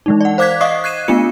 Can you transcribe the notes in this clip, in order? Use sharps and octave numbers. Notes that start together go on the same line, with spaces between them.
E3 G#3 D#4
D5 F#5
C5 F5 D6 F#6 G#6 B6
D#5 F5 C#6 D#6 C7
F#6 G#6 C7 D#7 E7
A3 B3 D4 F4 C#7